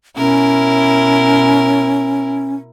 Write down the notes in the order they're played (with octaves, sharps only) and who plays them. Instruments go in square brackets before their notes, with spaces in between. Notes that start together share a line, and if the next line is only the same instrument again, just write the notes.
[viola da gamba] B2 E4 A#4 [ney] C#4